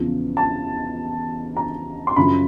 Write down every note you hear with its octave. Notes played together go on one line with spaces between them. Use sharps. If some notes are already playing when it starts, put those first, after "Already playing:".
Already playing: E2 C#3 F3
A5
A#5
C6
F#2 C#3 F3 B5